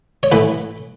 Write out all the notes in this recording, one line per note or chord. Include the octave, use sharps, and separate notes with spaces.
C#5
A2 E3 B4